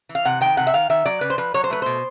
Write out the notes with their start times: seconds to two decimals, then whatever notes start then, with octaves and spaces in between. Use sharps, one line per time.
0.09 E3
0.15 F5
0.25 C3 F#5
0.41 D#3 G5
0.57 C3 F#5
0.67 E5
0.74 D#3 F5
0.90 D#3 E5
1.06 F#3 D5
1.21 C#3 B4
1.30 C5
1.38 F3 B4
1.54 F#3 C#5
1.64 C5
1.70 A3 B4
1.82 B2 C5